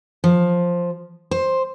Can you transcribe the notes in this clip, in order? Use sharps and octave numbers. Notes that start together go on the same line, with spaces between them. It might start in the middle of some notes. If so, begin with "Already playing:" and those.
F3
C5